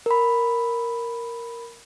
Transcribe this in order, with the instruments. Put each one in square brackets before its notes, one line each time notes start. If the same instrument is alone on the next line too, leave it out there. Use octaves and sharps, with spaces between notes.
[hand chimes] A#4 B5